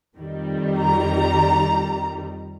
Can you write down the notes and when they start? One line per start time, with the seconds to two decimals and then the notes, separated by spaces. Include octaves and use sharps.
0.15 F2 D#3 G3
0.80 A#5